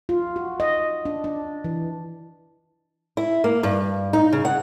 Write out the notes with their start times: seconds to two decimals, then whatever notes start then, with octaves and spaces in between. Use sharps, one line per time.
0.09 F4
0.36 F#4
0.60 D#5
1.05 D4
1.24 D4
1.64 E3
3.17 E4
3.44 A#3
3.63 G2
4.13 D#4
4.33 C#3
4.45 F#5